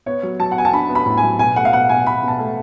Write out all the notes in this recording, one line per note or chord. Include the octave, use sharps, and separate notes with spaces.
B3 C#5
F#3
F#3 A5
F#5
B3 G#5
A5
D4 B5
B3
B5
A2
G#5
F#3
B2 G#5
A3 F#5
F5
B2 F#5
B2 G#5
B2 B5
B2 A5
A3